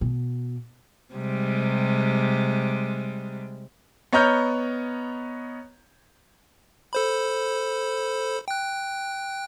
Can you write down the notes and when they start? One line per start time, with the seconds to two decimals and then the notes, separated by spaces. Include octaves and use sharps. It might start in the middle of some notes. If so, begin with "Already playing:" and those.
0.01 B2
1.14 C3 G3 G#3
4.13 B3 C#5 D#5 A#5 F6 G6
6.93 A4 C5 B5
8.48 G5 F#6